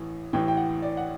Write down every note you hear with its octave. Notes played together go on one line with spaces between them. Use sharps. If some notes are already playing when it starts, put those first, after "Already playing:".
Already playing: A1 A2 E3
A1 A2 E3 G5
G5
F#5
D5
F#5